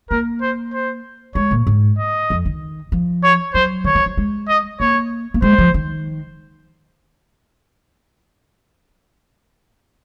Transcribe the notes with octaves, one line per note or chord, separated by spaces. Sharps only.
A#3 A#4
C5
C5
G#3 C#5
A#2
G#2
D#5
F2
D#3
F3
C#5
F#3 C5
D#3 C#5
F3
F#3
G#3
D#5
A#3 C#5
A#3
G#3 C5
F3
D#3